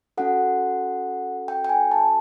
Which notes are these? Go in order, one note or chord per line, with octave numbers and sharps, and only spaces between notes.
C#4 F#4 A4 F#5
G5
G5
G#5
A5